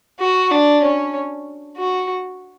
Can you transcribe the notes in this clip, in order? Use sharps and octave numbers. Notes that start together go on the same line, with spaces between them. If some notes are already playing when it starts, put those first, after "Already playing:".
F#4
D4
C#4
F#4